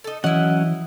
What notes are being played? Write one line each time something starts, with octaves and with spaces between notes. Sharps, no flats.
D#4 A4
E3 F#3 C#4 E4 D#5 F#5